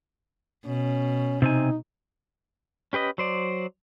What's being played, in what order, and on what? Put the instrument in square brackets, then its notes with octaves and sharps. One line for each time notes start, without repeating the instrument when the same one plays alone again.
[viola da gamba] B2 [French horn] C#4
[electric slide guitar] C3 C4 G#5 [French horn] D#4
[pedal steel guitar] C#4 G4 B4 D#5
F#3 C5 D5